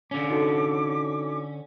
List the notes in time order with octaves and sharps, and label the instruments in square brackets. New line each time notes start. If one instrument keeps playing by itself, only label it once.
[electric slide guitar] D3 C#4 [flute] D6
[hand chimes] D#4 F#4 A4